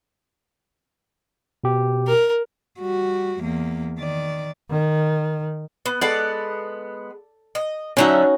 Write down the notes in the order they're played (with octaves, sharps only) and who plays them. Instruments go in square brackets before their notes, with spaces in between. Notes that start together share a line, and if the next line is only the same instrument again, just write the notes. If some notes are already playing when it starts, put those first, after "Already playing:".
[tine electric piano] B2 G4
[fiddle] A#4
[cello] G3 F#4
E2 A#3
D#3 D5
[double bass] D#3
[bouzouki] B3
[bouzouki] G#3 B3 F#5 [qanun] A4 D5
[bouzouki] D#5
[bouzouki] D3 F#3 E5 [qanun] C#4 D#4 F#4